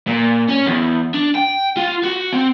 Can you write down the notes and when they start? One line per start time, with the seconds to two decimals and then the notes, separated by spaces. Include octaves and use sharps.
0.08 A#2
0.49 C#4
0.67 E2
1.14 D4
1.35 G5
1.77 F4
2.03 F#4
2.32 C4